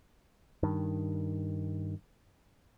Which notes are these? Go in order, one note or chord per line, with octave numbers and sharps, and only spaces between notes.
G2 D#3